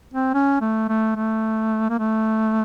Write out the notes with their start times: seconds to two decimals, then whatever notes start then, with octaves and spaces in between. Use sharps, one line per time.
0.14 C4
0.34 C#4
0.61 A3
0.89 A3
1.16 A3
1.90 A#3
1.99 A3